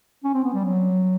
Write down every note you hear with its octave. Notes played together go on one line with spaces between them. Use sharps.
C#4
C4
B3
G3
F#3